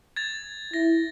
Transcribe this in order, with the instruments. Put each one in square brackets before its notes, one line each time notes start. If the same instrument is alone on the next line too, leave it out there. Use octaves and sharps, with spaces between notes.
[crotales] G#6 A6
[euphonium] E4 [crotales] A#6